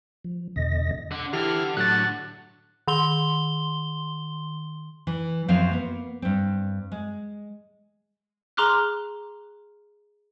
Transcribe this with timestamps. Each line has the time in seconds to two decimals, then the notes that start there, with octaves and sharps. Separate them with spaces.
0.24 F3
0.56 E2 B2 D3 D#5 A#6
1.11 D4 F#5
1.33 D3 E3 G4 F6
1.77 A2 F#3 F#6 A6
2.87 D#3 C6 G7
5.07 E3
5.48 F#2 F3 F#3 C4 A#4 F5
5.71 A#3 B3
6.22 G2 C4
6.92 G#3
8.57 G#4 A#5 C6 D6 F6 F#6